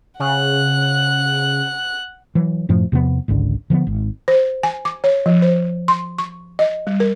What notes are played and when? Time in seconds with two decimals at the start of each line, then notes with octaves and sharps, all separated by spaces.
0.20 C#3 F#5 F#6
2.35 E3 F#3
2.69 F#2 A2 F3 A3
2.92 E2 C3 F3 B3
3.28 G#1 C#2 G#2 D3
3.70 D3 F3 G3 B3
3.87 G#1
4.28 C5
4.63 G#5
4.85 D6
5.04 C#5
5.26 F3
5.42 C5
5.88 C6
6.18 C#6
6.59 D#5
6.87 G3
7.00 A#4